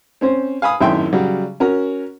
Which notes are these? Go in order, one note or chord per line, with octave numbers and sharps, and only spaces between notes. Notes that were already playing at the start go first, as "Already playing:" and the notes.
C4 C#4 C5
F5 G#5 B5 D#6
G#1 F#2 A2 E5 G5 C6
C#3 F#3 G3
C#4 F#4 A#4